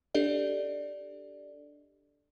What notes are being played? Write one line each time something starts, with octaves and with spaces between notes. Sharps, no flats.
D4 G4 A4 D5 D#5